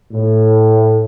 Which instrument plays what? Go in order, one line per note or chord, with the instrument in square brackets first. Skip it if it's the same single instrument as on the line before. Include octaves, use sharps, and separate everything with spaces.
[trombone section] A2